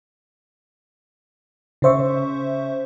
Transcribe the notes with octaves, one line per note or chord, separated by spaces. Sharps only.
C#3 C#4 C5 E5 C#6